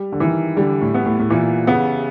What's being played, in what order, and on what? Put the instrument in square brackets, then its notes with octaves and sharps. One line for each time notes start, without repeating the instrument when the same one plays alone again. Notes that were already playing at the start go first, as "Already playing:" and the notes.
Already playing: [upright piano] G3
[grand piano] D3
[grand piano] D#3 [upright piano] E3
[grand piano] D3 [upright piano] G3
[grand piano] A2
[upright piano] B3
[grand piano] A2
A2
[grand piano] A#2 [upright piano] E3
[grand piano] C#3 [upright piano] B3